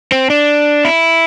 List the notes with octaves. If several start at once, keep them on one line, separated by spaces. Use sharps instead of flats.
C4
D4
E4